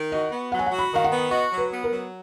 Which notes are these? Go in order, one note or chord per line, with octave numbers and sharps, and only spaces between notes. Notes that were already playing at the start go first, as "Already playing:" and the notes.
Already playing: D#3
F#4 D#5
B3
F#3 F#5
G#5
F#5
F#4
B5
D#3 F5
F#5
B3
F#4 D#5
F#3
B4
B3
A#4
F#3